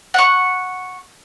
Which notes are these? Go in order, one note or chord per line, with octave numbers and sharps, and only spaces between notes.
F#5 C#6